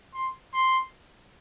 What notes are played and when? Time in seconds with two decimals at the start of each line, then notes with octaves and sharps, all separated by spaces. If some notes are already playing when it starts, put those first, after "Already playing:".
0.14 C6
0.54 C6